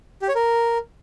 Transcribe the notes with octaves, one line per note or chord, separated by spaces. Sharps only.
G4
C#5
A#4